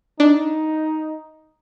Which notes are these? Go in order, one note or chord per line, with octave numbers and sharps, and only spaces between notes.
D4 D#4